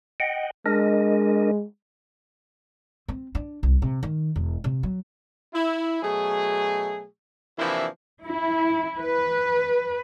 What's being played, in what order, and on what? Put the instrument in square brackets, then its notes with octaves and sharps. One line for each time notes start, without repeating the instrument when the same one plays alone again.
[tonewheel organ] D#5 F#5 G5
[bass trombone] G#3 [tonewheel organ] D4 A#4 D#5
[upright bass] C4
D4
C2
C3
D#3
E1
C3
F#3
[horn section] E4
B2 F#3 A3 G#4
C3 E3 F3 A#3 D4 E4
[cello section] E4
B4